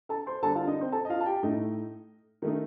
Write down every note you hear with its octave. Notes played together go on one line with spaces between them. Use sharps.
A4 A5
C5 C6
D3 G3 A#3 A4 A5
F4 F5
D#4 D#5
C4 C5
A4 A5
D#5
F4 F5
A5
G4 G5
A2 A3 D#4 D#5
D#3 A3 A#3 D#4 A#4